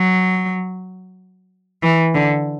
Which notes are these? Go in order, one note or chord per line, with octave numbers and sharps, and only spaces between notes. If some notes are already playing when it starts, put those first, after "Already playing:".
Already playing: F#3
E3
D3